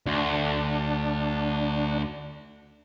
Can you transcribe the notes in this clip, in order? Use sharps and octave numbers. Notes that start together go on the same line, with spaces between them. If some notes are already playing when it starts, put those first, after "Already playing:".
D2 D4